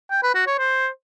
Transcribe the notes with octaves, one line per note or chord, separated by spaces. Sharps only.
G5
B4
F#4
C#5
C5